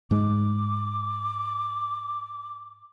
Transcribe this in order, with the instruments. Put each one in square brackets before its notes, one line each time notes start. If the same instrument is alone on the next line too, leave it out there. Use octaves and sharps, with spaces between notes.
[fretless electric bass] G#2 G#3 [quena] D6